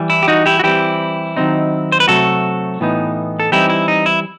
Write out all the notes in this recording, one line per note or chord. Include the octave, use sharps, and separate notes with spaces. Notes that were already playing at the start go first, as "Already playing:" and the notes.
Already playing: E3 G3
E4
G4
D#4 F#4
E4 G4
F#4
E3 G3 C4 E4 G4
D#3 F#3 C4 D#4
C5
B4
C3 F#3 A3 F#4 A4
A2 E3 B3 D#4
A4
E3 G3 C4 D#4 E4 G4
E4
D#4
E4